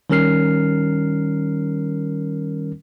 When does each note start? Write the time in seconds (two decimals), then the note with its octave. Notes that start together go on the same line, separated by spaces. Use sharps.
0.10 D#3 G3 C#4 A#4 F6 C7